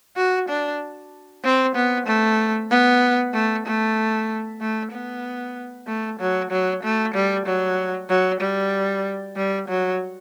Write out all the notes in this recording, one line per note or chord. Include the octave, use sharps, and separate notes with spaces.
F#4
D4
C4
B3
A3
B3
A3
A3
A3
B3
A3
F#3
F#3
A3
G3
F#3
F#3
G3
G3
F#3